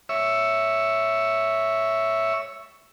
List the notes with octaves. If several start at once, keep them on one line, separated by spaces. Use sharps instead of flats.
C#5 E5